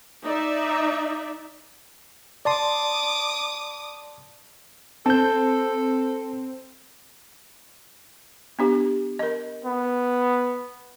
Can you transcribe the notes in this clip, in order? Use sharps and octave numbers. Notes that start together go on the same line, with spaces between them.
D#4 D5 E5
D5 A5 C6 D6 D#6
C4 A4 A5 G6
B3 D4 G4
A#4 D#5
B3